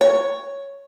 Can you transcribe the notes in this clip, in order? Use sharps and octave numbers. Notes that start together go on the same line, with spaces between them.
C#5